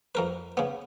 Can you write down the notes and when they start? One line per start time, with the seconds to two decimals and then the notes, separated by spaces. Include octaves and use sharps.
0.15 F2 A#4 B4
0.57 C#3 B3